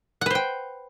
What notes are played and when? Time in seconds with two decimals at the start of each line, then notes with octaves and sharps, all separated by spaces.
0.21 F#5
0.26 B4
0.30 C5
0.35 G5